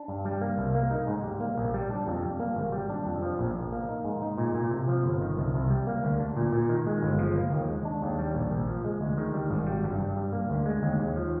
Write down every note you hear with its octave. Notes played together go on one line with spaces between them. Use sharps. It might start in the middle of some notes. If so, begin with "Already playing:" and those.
Already playing: D4
G2
G3
A#3
C2
A#3
D#4
G#2
G3
A#3
A#1
G3
D4
F2
G3
A#3
G#1
G3
D4
F2
F3
A#1
A#1
A#3
D#4
G#2
D#4
A#2
A#2
C3
F3
G1
D#3
C2
C2
G3
A#3
D2
D4
A#2
A#2
D#3
G#3
G1
F3
A#3
D#2
G#3
D4
D#2
G3
A#1
A#1
F3
G#3
D2
D#3
G3
G#1
G3
G2
G2
G3
A#3
D2
G#3
D#2
D#2
F3